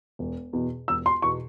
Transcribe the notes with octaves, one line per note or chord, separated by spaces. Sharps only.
E1
E2 B2
E1 E6
C6
E2 B2 C#6